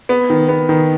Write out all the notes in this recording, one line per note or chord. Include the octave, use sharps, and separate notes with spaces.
B3
D#3
B3
D#3